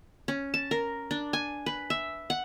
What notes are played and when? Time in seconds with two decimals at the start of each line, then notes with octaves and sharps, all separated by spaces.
0.28 C#4
0.54 A5
0.71 A#4
1.11 D4
1.33 G#5
1.66 B4
1.90 E5
2.30 F#5